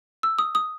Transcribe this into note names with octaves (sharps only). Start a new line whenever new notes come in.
E6
D#6
D#6